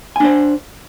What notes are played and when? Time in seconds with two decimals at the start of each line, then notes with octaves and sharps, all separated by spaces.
0.16 G#5
0.20 D4
0.24 C5